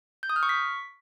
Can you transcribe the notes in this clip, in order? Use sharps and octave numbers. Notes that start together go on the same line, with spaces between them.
G6
D#6
F6
C#6
B6